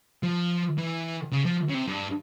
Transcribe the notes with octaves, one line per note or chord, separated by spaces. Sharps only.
F3
E3
C#3
F3
C#3
C3
G2